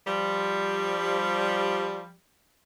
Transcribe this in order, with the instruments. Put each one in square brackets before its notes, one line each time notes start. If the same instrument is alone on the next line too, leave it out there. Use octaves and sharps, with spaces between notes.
[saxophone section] F3 G3